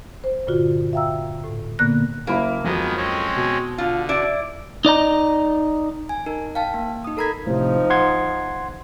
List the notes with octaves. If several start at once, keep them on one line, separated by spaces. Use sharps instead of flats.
C5
G2 A#2 D3 F4 F#4
E5 F5 G5 A#5 E6
A2
A#2 D3 A#3 B3 F#6 A#6
F#1 A#3 E4 E5
F2 D#3 F3 F#3 G#3 B3
G#3 C4 C#4
B2
D3 F4
E4 D5
D#4 D5 D#5 A#5
G#5
D#4 A#4
F5 G5 A5
A#3
D#4 D#6
A4 A#4 A#5 B5 G#6 B6
A2 C3 F3 D#4
F#5 C6 G#6